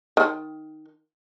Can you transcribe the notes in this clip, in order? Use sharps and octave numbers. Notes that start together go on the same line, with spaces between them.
D#3